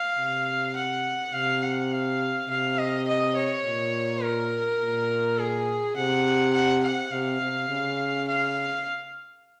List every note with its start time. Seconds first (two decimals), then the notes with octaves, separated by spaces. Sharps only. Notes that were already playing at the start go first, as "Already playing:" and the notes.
Already playing: F5
0.18 C3
0.75 F#5
1.33 C3 F5
1.62 F#5
1.92 F5
2.49 C3 F5
2.78 D#5
3.08 D#5
3.36 C#5
3.65 A#2
4.23 A#4
4.81 A#2
5.38 G#4
5.96 C3 F#5
6.54 F#5
6.83 F#5
7.11 C3 F5
7.41 C3
7.69 C#3
8.28 F5